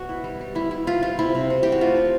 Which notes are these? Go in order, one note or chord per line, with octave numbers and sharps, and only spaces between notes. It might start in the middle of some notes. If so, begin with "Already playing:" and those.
Already playing: B2 F#4
E4
G3
G3
G3 E4
E4
E4 F4
G3 F4
C3 E4
C3
C3
C3 G4
F#4
A3 F4
C3